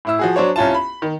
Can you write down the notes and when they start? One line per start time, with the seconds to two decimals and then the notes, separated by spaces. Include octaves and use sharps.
0.05 A2 E4 E6
0.19 F3 F#4 G#4
0.36 F#3 D4 C5 C#5
0.56 C2 C#4 F4 A5
0.74 B5
1.02 D#3